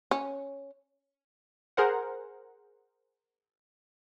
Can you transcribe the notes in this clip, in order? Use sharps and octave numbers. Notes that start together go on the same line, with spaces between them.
C#4
G#4 A#4 C5 F#5